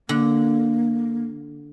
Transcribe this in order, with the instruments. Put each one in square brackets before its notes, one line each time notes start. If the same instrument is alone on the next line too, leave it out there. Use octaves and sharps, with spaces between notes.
[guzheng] D3 [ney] A#3